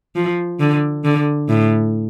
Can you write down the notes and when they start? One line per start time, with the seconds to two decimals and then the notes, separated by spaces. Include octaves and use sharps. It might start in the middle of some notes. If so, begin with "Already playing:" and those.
0.15 F3
0.60 D3
1.04 D3
1.49 A2